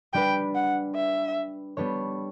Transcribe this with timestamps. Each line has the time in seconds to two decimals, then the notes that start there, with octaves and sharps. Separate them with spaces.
0.13 G3 D4 G4 B4 G5
0.55 F#5
0.95 E5
1.77 G3 B3 D4 A4 C#5